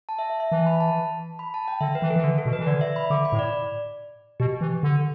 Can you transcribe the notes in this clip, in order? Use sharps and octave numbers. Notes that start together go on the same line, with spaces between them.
A5
E5
E5
E5
E3 A5
B5
A5
B5
A5
G5
D3 E5
B4
E3
A4
E3
D3
A4
B2
B4
E3
D3 D5
E5
B5
D3 D6
B5
A2
D5
B2 G4
E3
D3